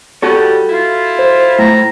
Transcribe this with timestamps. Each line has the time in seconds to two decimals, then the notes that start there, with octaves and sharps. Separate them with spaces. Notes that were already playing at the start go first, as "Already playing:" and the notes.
0.23 G3 F#4 A4 C#5
0.69 E4 F4
1.19 C5
1.59 A2 A#5